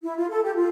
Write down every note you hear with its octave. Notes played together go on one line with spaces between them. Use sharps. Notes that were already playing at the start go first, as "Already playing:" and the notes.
E4
F4
A4
G4
F4